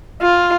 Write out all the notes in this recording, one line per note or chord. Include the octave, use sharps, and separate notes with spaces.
F4